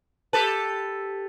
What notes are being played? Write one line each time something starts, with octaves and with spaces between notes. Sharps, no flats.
G4 A4 B4 A5